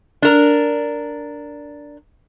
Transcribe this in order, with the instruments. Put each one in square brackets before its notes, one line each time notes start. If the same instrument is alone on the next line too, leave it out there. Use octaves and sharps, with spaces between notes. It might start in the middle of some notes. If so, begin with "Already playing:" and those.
[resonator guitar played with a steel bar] D4 A#4